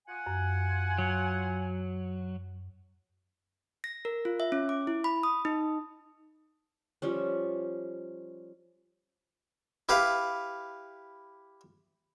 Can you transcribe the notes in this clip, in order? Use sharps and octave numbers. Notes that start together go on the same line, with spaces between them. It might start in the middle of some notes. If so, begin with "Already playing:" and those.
F4 F#5 G#5
F#2
F#3
A#6
A#4
F4
E5
C#4
D6
E4
B5
D#6
D#4
F3 G3 C#4
E4 G4 B4 F5